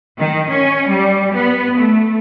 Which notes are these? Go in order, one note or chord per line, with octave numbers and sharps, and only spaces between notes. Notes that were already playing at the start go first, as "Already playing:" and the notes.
D#3
C#4
G3
B3
A3